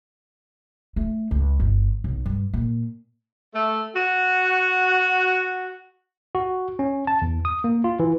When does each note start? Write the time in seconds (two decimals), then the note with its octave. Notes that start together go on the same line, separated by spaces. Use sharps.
0.96 A3
1.31 C#2
1.60 G1
2.04 B1
2.26 G2
2.54 A#2
3.54 A3
3.95 F#4
6.35 F#4
6.79 C#4
7.07 A5
7.22 E2
7.45 D#6
7.64 A#3
7.84 F4
8.00 E3